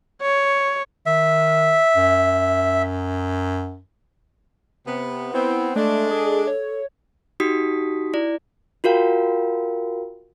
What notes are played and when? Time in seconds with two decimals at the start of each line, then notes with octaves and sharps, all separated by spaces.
0.22 C#5
1.06 D#3 E5
1.96 F#2
4.87 C3 B3
5.34 B3 C4 E4
5.76 G#3 A3 D4 A4
6.11 G#4
6.47 C#5
7.40 D#4 F#4 G4 D#6 B6
8.14 E4 D5
8.84 F4 F#4 A#4 F5 G5